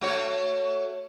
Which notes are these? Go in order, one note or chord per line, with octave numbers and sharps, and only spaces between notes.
A3 F#4 C#5